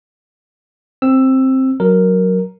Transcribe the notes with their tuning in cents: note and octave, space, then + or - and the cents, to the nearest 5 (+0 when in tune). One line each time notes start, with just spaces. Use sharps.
C4 +10 E6 +10
F#3 +0 A#4 +0